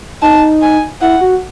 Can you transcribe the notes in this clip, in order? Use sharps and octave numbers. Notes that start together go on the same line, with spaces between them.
D#4 A5
G#5
E4 F#5
F#4